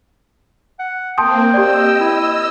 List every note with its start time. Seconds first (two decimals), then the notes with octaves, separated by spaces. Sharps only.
0.79 F#5
1.18 A#3 C4 G5 A5 C6 D#6
1.54 G4 D5 D#5 E6
2.00 E4